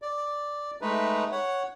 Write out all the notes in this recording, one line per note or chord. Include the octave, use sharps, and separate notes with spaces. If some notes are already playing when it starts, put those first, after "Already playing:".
D5
G#3 A3 D#4 B4
C#5 F#5